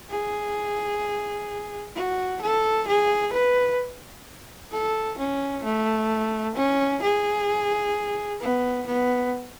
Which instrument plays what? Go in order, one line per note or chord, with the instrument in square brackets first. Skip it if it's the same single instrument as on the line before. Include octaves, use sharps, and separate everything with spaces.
[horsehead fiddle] G#4
F#4
A4
G#4
B4
A4
C#4
A3
C#4
G#4
B3
B3